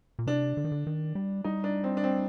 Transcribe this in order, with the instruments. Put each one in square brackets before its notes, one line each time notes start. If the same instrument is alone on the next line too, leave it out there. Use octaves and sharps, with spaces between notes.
[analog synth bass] A#2
[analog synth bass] C3 [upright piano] D4
[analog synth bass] D3
D#3
D3
D#3
G3
[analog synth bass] G3 [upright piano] D#4
[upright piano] D4
C4
D4
C4